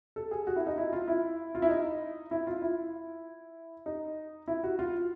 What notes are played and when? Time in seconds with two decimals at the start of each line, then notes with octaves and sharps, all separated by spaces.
0.16 A4
0.31 G#4
0.47 F#4
0.56 E4
0.67 D#4
0.78 E4
0.93 F4
1.08 E4
1.55 F4
1.62 E4
1.69 D#4
2.31 E4
2.47 F4
2.62 E4
3.86 D#4
4.48 E4
4.64 F#4
4.79 F4